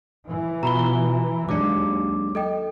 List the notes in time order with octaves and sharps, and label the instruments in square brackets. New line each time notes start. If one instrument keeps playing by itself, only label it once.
[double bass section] E3
[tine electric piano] B2 F4 [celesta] A#5 B5 G7
[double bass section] D#2 [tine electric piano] F#3 G#3 D4 [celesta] D6
[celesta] A4 D#5 G5